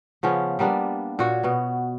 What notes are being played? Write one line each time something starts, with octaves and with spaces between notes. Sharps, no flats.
C#3 F3 B3 C#4
G3 A#3 B3 D4
A#2 F#4 C#5
B2 B3